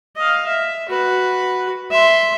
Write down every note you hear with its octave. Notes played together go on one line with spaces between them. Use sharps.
D#5 F5
E5
F#4 B4
E5 C6